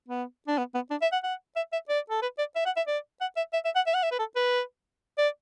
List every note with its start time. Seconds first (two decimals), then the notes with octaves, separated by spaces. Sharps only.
0.09 B3
0.48 D4
0.58 B3
0.75 B3
0.91 D4
1.02 E5
1.13 F#5
1.24 F#5
1.56 E5
1.73 E5
1.89 D5
2.10 A4
2.22 B4
2.39 D5
2.56 E5
2.66 F#5
2.77 E5
2.88 D5
3.21 F#5
3.37 E5
3.53 E5
3.65 E5
3.76 F#5
3.87 E5
3.95 F#5
4.03 E5
4.12 B4
4.19 A4
4.36 B4
5.18 D5